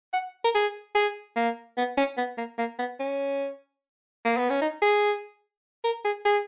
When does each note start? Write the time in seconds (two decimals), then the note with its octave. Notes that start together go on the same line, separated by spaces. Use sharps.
0.13 F#5
0.44 A#4
0.55 G#4
0.95 G#4
1.36 A#3
1.77 B3
1.97 C#4
2.17 B3
2.37 A#3
2.58 A#3
2.79 B3
2.99 C#4
4.25 A#3
4.37 B3
4.50 C#4
4.62 D#4
4.82 G#4
5.84 A#4
6.04 G#4
6.25 G#4